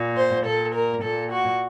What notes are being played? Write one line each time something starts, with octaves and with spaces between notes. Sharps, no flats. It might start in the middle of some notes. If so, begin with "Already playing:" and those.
Already playing: A#2
C5
A#2 A4
A#4
A#2 A4
F#4